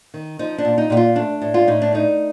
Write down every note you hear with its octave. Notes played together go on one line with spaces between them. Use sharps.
D#3
F3 D#4
D4
A#2
D#4
A#2 G4
F4
A3 D4
A2
F4
A2 D#4
D4
A3 D#4